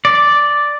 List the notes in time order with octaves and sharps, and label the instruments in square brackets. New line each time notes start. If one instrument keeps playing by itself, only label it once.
[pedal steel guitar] D5